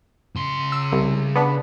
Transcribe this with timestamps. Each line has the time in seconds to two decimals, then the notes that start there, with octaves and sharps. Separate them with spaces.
0.36 C#3 C6
0.72 E6
0.92 C2
1.35 B3 D4